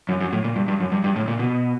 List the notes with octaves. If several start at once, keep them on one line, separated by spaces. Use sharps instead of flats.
F#2
F#2
A2
A#2
G2
G2
F#2
G2
G2
A2
A#2
B2